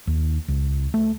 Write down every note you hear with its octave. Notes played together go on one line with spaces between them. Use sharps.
D#2
C#2
A3